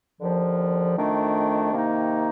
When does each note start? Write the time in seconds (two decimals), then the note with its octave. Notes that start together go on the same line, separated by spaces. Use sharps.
0.21 D#2 D3 F3
0.96 F2 D#3 A3 D4
1.73 C3 D#3 A#3 D#4